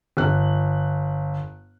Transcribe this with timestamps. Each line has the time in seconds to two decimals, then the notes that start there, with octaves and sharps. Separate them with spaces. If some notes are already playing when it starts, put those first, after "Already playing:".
0.17 G1 F#6